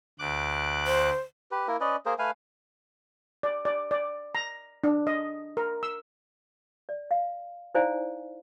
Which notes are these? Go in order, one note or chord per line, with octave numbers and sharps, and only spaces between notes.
D2 D6 F#6
C5
G4 B4
A#3 E4 A#4
C#4 B4 D5 D#5
A#3 G#4 A#4 C5
A3 B4 F5 G#5
D5
D5
D5
A#5
D4
D#5
A#4
E6
D5
F5
D#4 E4 C5 D5 F5 G#5